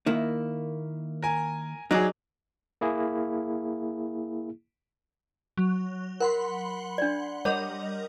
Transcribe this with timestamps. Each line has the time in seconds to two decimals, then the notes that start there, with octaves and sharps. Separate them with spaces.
0.06 D#3 A#3 E4
1.23 A#4 G#5
1.91 F#3 D#4 G#4 D5
2.81 A#3 E4 G#4
5.57 F#3
6.20 A#4 F#5 B5 C6
6.98 D4 D5
7.45 G3 A#4 C#5 D#5 F#5